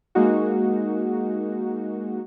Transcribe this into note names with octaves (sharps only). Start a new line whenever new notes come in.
G#3 A#3 D#4 F#4